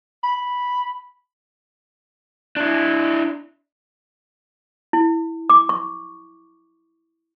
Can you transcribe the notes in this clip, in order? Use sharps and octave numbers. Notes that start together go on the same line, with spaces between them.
B5
D4 E4
E4
D6
C#6